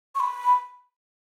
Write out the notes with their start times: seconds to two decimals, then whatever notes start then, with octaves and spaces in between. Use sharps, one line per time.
0.15 C#6
0.20 B5